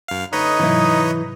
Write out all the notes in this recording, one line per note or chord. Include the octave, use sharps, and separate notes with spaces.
F#2 F5
D2 D#4 B4 C#5 D#5
G#2 C3 E3 F#3 E4